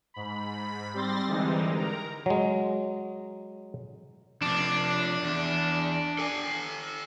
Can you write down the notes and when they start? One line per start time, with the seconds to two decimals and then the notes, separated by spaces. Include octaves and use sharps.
0.14 G#2 B5
0.94 G3 C4 C6 A6 A#6
1.27 D3 E3 G3 G#3 C4 D#4
1.76 A#4 A#5
2.26 F#3 G#3
4.42 F2 C3 D4
5.24 E2
6.19 A4 G#5